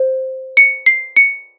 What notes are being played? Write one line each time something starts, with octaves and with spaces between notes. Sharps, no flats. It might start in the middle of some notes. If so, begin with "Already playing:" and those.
Already playing: C5
C#7
C7
C#7